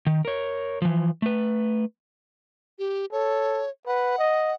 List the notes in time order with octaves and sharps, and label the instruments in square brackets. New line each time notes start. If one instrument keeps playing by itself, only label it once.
[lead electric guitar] D#3
A#4 C#5
E3 F3
A3 B4
[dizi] G4
[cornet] A4 [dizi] C#5
[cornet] B4 [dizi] F#5
[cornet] D#5